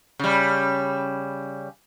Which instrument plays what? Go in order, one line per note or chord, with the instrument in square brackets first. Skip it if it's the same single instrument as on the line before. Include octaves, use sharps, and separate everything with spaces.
[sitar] C#3 G3